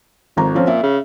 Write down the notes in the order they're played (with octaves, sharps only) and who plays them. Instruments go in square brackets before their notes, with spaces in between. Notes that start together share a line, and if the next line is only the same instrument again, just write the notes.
[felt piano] G#1 A#5 [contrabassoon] F2
[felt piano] F3 C4 C#4
[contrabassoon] A#2 [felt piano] E5
[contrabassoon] C#3